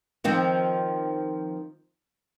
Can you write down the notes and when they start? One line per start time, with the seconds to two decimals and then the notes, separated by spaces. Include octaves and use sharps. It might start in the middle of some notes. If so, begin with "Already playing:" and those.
0.24 D#3 F3 C4